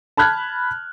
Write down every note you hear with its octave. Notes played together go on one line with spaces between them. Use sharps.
A5 B5 F6 F#6 G#6